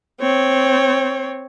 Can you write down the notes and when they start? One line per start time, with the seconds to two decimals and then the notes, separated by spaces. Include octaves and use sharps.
0.21 C4 C#5